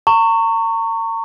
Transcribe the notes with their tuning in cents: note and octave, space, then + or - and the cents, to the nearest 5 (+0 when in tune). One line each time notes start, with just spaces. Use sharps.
A#5 -40 C#6 +0